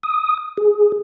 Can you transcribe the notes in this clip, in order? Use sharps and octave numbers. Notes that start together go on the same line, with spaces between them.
D#6
G#4